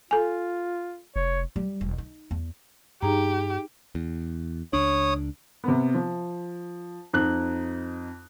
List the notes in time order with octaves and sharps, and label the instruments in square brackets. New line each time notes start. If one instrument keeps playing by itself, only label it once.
[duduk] F4 [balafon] A4 G#5
[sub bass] F1 [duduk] C#5
[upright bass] G3
E1
D#4
E2
[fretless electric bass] G2 [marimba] D#4 G#4 A#5 [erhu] G4
[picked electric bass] E2
[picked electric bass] C#2 D4 [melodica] C#5 D#6
[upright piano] C3 B3
F3
F2 D#4 F#6